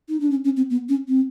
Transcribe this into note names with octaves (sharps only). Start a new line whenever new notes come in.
D#4
D4
C#4
C#4
C4
B3
C#4
C4